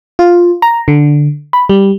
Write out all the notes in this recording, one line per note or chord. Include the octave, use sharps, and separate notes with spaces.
F4
A#5
D3
B5
G3